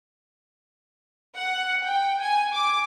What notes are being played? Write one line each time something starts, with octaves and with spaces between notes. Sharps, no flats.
F#5
G5
G#5
D6